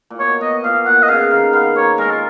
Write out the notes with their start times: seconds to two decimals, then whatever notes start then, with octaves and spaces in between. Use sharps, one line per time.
0.10 A#2
0.19 B2 C#5
0.41 B2 D#5
0.64 A#2 F5
0.86 B2 F#5
1.03 D#5
1.08 C#3 F5
1.31 D#3 F5
1.53 B3 F5
1.76 A#3 C#5
1.98 G#3 A#4
2.11 F4